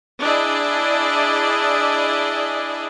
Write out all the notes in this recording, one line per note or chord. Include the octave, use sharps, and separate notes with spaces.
D4 E4 G#4 D5 D#5